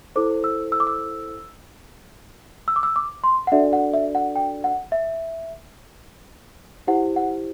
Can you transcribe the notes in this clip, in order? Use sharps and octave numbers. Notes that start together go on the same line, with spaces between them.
E4 A4 C5 D6
E6
E6
D6
E6
E6
D6
E6
D6
C6
F#5
D4 F#4 A4 D5 E5
F#5
E5
F#5
G5
F#5
E5
E4 G4 C5 F#5
F#5